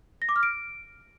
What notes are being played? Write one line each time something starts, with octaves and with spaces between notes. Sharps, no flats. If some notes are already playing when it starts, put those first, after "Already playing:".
A#6
D6
F6
D7